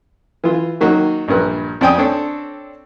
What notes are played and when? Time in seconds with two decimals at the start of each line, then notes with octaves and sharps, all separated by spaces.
0.44 E3 F4
0.81 D#3 F#3 A#3 D#4
1.28 A#1 G2 A#4 B4
1.81 F2 C4 D5 G5 G#5 D#6
1.98 C4 D4 A4 C#5